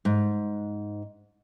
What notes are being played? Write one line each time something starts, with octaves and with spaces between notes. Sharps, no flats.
G#2